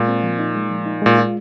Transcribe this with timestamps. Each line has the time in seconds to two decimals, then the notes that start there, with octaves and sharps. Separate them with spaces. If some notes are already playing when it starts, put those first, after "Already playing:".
Already playing: A#2 G#3
0.08 C4
0.23 F3
0.39 D#4
0.55 G#3
0.70 F3
0.86 D#4
1.02 A#2 G#3
1.18 F4